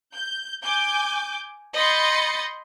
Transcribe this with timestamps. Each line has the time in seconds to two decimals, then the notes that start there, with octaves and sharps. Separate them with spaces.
0.15 G6
0.63 G#5 D6 G6
1.75 D#5 B5 C6 G6 A6 C#7